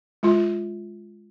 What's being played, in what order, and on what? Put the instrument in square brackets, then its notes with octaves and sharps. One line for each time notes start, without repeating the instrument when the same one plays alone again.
[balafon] G#3 F4